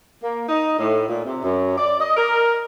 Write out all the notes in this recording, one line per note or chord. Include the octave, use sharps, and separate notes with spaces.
A#3
D#4
A2
A#2
C3
F#2
D5
D#5
A#4